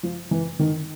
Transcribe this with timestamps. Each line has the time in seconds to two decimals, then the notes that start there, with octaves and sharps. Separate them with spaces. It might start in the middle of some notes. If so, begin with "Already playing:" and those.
0.03 F3
0.31 E3
0.59 D#3